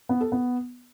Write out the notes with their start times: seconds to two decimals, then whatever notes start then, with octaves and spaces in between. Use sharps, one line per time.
0.09 B3
0.21 A4
0.32 B3